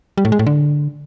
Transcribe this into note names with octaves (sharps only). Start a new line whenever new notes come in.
G3
A2
G#3
A2
D3